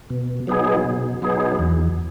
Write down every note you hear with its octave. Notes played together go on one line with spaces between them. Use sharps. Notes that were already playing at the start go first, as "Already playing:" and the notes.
B2
F#3 B3 D#4 G#4
B2
F#3 B3 D#4 G#4
E2